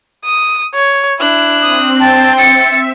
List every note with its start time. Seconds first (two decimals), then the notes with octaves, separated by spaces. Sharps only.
0.25 D#6
0.75 C#5
1.20 D4 E4 F#6
1.62 C4 D#6
2.00 G5 A5
2.38 E5 A6 C#7